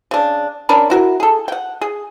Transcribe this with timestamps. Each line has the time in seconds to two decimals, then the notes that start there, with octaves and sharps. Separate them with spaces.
0.11 C#3 D4
0.69 C#4 D4 A#4 B5
0.90 E4 F#4 A#4
1.20 G#4 A4
1.48 F#5 G5
1.81 G#4